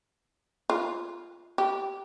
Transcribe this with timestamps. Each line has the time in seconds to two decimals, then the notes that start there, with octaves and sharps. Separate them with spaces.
0.70 F4
1.58 G4